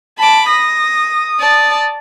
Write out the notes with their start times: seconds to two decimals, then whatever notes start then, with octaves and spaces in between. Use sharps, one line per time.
0.18 A5 B5 D6
0.49 D#6 A#6
1.39 D5 A5